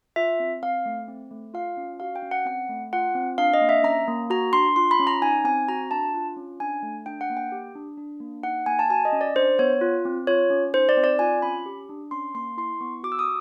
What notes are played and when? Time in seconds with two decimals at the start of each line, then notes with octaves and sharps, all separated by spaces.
0.16 F4 E5
0.40 C4
0.63 C4 F5
0.86 A3
1.08 C4
1.31 A3
1.54 F4 F5
1.77 C#4
2.00 F#4 F5
2.16 G5
2.23 C#4
2.31 F#5
2.46 C4 F#5
2.69 A3
2.93 F4 F#5
3.15 C4
3.38 D4 F5
3.54 D#5
3.61 A#3
3.69 E5
3.84 C#4 A#5
4.08 A#3
4.30 F#4 A#5
4.53 D4 C6
4.76 F4 C6
4.91 B5
4.99 C#4
5.07 A#5
5.22 D#4 G#5
5.45 C4 G#5
5.68 F#4 A#5
5.91 D4 A5
6.14 F4
6.36 C#4
6.60 D4 G#5
6.82 A3
7.06 D4 G5
7.21 F#5
7.29 A#3
7.37 G5
7.52 G4
7.75 D4
7.97 D4
8.20 A#3
8.43 D#4 F#5
8.66 A#3 G#5
8.79 A5
8.90 F#4 G#5
9.05 D#5
9.12 C#4
9.21 D5
9.35 D4 C5
9.59 B3 C#5
9.81 F4
10.05 C4
10.27 F4 C#5
10.50 C#4
10.74 D#4 C5
10.89 D5
10.97 C4
11.04 D5
11.19 F4 G#5
11.42 C#4 B5
11.66 G4
11.89 D4
12.11 C#4 C6
12.35 A#3 C6
12.57 E4 C6
12.81 B3 C#6
13.03 F#4 D6
13.12 E6
13.19 D#6